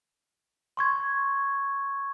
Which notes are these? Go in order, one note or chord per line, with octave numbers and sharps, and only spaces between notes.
C6 C#6 G#6